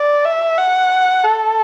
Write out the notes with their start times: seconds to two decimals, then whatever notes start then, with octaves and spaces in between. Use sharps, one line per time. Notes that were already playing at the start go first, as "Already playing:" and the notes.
Already playing: D5
0.25 E5
0.58 F#5
1.24 A4